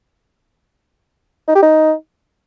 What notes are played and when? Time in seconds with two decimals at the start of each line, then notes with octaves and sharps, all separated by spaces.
1.48 D#4
1.55 G4
1.62 D#4